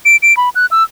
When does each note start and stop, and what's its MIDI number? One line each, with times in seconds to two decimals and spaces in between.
0.05 0.16 98
0.23 0.35 98
0.37 0.49 83
0.55 0.66 90
0.71 0.83 88